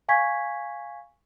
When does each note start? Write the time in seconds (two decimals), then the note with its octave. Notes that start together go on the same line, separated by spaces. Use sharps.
0.08 F5 G#5 C#6 G#6 B6